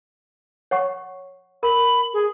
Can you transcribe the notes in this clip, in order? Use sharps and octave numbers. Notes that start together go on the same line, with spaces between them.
C#5 F#5 C#6
A#4 B5
G#4